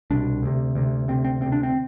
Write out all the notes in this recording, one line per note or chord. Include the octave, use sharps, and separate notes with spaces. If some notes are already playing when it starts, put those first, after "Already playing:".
C2 B2 D4
D2 C3
D2 C3
D2 C3 C4
C4
D2 C3 C4
D4
C4